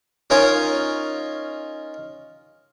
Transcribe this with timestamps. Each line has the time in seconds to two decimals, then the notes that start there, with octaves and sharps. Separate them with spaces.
0.30 C#4 D#4 F4 A#4 C#5 D#5